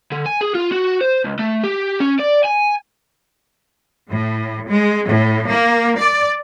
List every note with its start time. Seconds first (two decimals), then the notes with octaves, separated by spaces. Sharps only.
0.12 D3
0.26 G#5
0.41 G#4
0.55 F4
0.72 F#4
1.01 C5
1.25 C#2
1.39 A3
1.64 G4
2.00 C#4
2.20 D5
2.45 G#5
4.10 A2
4.68 G#3
5.07 A2
5.49 A#3
5.99 D5